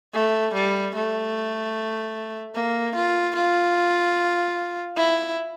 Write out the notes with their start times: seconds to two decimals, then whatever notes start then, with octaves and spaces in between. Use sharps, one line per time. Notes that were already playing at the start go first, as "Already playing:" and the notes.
0.14 A3
0.54 G3
0.95 A3
2.55 A#3
2.95 F4
3.35 F4
4.96 E4